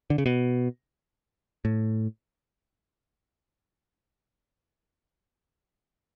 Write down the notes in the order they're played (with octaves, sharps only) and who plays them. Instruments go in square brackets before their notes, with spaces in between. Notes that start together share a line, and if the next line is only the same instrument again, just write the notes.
[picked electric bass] D3
C#3
B2
A2